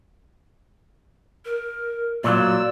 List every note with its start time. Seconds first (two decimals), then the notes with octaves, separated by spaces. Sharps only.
1.45 A#4
2.24 A#2 F#3 F4 D5 E6